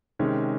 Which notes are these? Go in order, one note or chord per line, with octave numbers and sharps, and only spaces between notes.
C3 D#3 G#3 C#4